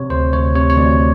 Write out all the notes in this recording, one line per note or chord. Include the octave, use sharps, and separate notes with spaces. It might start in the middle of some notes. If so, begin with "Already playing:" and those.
Already playing: C3 C#5
D2 C5
D2 C#5
C3 C#5
C#5
D2 D5